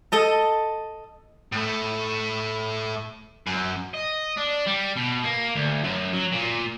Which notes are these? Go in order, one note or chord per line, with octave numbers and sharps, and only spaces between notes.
A4 D#5 A5
A2 A3
F#2
D#5
D4
G3
B2
A#3
D2
F#2
F#3
A#2